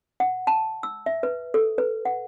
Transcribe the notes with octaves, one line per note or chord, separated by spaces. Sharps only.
F#5
A5
E6
E5
B4
A4
B4
F#5